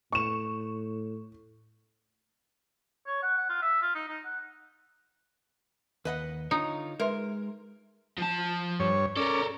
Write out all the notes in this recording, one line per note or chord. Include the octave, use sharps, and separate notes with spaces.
A2 C#6 E7
C#5
F#5
F#5
F4
E5
F4
D#4
D#4
F#5
D#2 B4 D#5 F#5
D3 D#4 F4 C#5
G#3 A#4 B4 E5 C6
F3 A5
G2 C#5
C#4 A4 A#4 D5